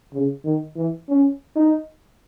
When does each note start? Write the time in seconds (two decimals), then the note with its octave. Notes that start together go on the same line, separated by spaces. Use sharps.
0.13 C#3
0.45 D#3
0.76 E3
1.09 C#4
1.56 D#4